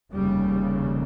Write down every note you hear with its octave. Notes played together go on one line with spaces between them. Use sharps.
F1 D#2 C#3 G3